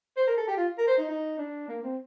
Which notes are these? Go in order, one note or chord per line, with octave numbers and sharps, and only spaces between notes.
C5
A#4
A4
G4
F4
A#4
C5
D#4
D#4
D4
A#3
C4